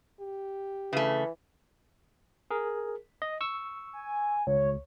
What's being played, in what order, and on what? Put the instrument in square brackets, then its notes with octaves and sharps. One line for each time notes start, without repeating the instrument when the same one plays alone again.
[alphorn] G4
[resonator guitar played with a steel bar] C#3 A3 [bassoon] E3
[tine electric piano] G#4 A#4
D#5
C#6 E6
[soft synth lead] G#5
[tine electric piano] C#2 [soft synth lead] C#5